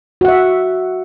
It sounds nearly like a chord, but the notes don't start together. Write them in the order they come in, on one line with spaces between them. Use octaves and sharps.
F#4 F#5 E5